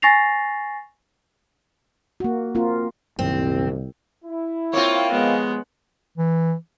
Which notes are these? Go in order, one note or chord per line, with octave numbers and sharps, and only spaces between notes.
G#5 C#6 A6 A#6 C7 F7
A#3 F#4
A#3 C4 F4 A#4
C2 F#2 A#2 D#3 C4
E4
A#3 C4 F4 C#5
D#2 F3 G#3 B3
E3